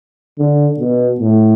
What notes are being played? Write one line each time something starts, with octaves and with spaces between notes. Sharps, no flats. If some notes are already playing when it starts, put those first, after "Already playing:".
D3
B2
A2